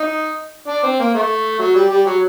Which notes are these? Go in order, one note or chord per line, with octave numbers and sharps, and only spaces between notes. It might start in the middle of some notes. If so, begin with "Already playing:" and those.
Already playing: D#4
D4
C4
A#3
A3
F#3
G3
G3
F#3